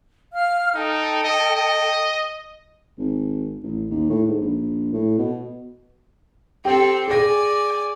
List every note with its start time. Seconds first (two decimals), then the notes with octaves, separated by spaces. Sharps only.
0.32 F5 F6
0.74 D#4 A4 G5
1.24 D#5
1.56 D#5
2.98 G#1
3.63 A1
3.90 D#2
4.09 A2
4.29 G#2
4.41 A#1
4.93 A2
5.18 B2
6.65 C4 G4 A4
7.08 G#4 D5 G#5 A#6